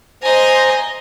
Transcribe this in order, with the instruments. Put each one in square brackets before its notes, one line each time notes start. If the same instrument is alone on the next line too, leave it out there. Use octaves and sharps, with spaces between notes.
[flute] C5 [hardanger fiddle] D#5 G#5 [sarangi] A#5